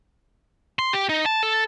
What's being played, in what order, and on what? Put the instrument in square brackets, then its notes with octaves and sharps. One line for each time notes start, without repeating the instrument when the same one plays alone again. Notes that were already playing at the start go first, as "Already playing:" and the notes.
[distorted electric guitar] C6
G4
D#4
A5
A4